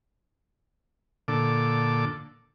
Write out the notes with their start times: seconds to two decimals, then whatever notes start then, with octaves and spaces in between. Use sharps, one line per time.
1.28 A#2 D3 A4 D6